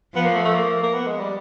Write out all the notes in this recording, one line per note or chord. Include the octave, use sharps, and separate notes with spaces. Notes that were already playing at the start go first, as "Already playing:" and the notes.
F3 B3
A#3
A3
A3
A#3
A#3
B3
G#3
G3